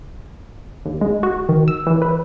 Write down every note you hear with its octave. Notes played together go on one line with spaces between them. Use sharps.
D#2
G#3
F#4
D#3
E6
E3
B4